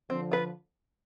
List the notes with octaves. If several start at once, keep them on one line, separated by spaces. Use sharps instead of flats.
D3 F3 C4
F4 B4